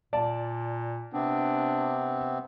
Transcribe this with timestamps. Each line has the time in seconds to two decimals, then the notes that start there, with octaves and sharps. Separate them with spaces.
0.13 A#2 D5 A5
1.13 C3 B3 C4 D4